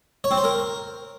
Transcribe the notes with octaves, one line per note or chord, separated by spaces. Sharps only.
C#5
C4
C5
A#4